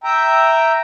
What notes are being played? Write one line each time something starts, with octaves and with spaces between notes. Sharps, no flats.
E5 G5 A#5